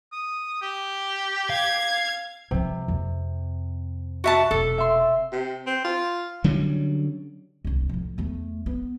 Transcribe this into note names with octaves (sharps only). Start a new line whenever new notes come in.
D#6
G4
F5 G#6
C3 F3 G3
F2 A#3
F#4 E5 A5
E1 A4
E5 C6
C3
C4
F4
D3 F#3 G3 C#4
D1 C2
A2 F3
E2 A3
B3